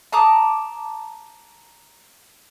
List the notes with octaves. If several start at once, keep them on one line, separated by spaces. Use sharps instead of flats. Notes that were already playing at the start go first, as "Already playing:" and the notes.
A5 A#5 D6 D#6